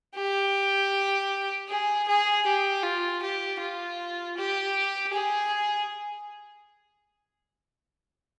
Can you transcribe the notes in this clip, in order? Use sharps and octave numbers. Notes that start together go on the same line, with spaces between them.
G4
G#4
G#4
G4
F4
G4
F4
G4
G#4